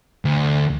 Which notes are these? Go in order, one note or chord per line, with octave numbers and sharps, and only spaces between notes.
D2